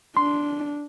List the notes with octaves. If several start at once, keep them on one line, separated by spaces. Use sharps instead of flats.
D4 C6